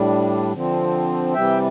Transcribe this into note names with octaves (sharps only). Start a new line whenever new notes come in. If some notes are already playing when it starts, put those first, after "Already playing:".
Already playing: A2 G3 D4
D3 F3 C4
C3 E3 G3 E5 G5